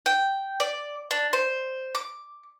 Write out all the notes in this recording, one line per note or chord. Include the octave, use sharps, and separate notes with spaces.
G5
D5
D4
C5
D6